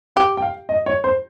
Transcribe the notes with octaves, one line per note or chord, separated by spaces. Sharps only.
G4 G5
G5
F5
D#5
C#5
C5